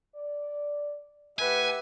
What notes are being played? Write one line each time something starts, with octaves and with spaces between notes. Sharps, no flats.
D5
A2 G4 B4 E5 F#5 G#5